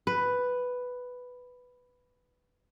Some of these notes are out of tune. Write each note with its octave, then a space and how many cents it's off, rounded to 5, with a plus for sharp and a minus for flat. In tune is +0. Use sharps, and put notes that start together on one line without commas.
B4 +5